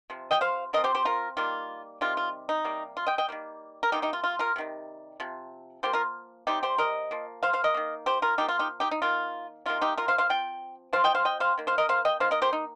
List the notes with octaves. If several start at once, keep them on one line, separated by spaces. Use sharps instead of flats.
C3 F3
D#5 G5
C5 F5
F3 C4 A#4 D#5
G4 C5
G4 C5
F4 A#4
D#3 G3 A#3 F4
C3 D#3 G3 F4
F4
D#4
C3 G3 A#3
F4
D#5 G5
D#5 G5
D#3 G3 A#3
A#4
C3 F3 A#3 D#4 G4
D#4 G4
F4
F4
F4 A#4
C3 D#3 G3
C3 F3
F3 A#3 G4 C5
F4 A#4
C3 G3 C4 D#4 G4
G4 C5
A#4 D#5
F3 A#3
C5 F5
C5 F5
A#4 D#5
D#3 A#3
G4 C5
F4 A#4
F3 A#3 D#4 G4
F4
D#4 G4
D#4 G4
D#4
D#3 A#3 F4
C3 D#3 A#3 F4
D#4 G4
F4 A#4
C5 F5
C5 F5
F3 C4 G5
F3 C4 C5 F5
D#5 G5
C5 F5
D#5 G5
C5 F5
D#3 A#3
C5 F5
A#4 D#5
C5 F5
D#5 G5
D#3 A#3 C5 F5
A#4 D#5
G4 C5
D#4